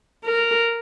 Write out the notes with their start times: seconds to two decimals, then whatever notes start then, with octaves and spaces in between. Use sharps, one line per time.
0.25 A#4